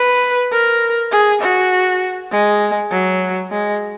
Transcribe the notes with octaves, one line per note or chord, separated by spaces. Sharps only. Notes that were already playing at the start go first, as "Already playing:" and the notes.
Already playing: B4
A#4
G#4
F#4
G#3
F#3
G#3